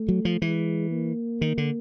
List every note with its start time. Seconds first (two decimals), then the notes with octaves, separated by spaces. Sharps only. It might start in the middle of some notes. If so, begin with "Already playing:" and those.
Already playing: A3
0.09 F#3
0.25 F3
0.42 E3 G#3
0.91 A#3
1.41 D#3
1.58 D3